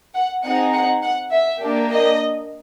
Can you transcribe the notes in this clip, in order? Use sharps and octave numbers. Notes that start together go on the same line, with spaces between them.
F#5
C4 D#4 G#4 F#5
F#5
F#5
E5
A#3 D4 G4
D#5